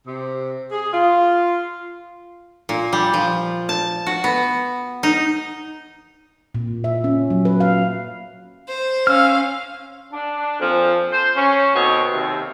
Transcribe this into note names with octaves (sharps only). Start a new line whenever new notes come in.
C3
G#4
F4
A#2
G3
F3
A5
F#4
B3
D#4
A#2
E5
C#4
F#3
B4
F5
C5
C#4 F5 E6 F6
D4
F2 A#2 F3
C5
C#4
B2 D3 C4 D#4 C#5
D#2 C3